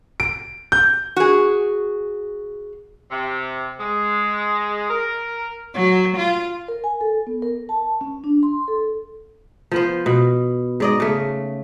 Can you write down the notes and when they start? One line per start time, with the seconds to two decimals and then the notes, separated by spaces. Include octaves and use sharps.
0.20 D7
0.72 G6
1.16 F#4 G#4
3.11 C3
3.79 G#3
4.89 A#4
5.74 F#3
6.17 F4
6.68 A#4
6.84 G#5
7.01 A4
7.27 B3
7.42 A#4
7.69 A5
8.01 C#4
8.24 D4
8.43 C6
8.68 A4
9.72 F3 B3 C5
10.06 B2
10.80 G#2 D5 D#5
11.00 C#3 A3